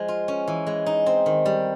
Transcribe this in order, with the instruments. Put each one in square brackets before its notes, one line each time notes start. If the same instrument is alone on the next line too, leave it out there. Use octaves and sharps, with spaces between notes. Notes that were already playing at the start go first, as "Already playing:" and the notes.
Already playing: [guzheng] F3 G#3
F4
C#4
E3
G#3
D#4
C4
D#3
G3